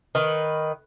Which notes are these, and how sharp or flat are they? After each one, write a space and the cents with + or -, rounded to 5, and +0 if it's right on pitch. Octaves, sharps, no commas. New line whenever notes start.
D#3 +0 B4 +0